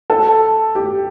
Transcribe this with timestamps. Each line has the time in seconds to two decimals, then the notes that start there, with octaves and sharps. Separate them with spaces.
0.10 A4
0.75 G4